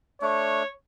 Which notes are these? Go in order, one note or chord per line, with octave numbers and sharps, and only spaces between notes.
A3 D4 C#5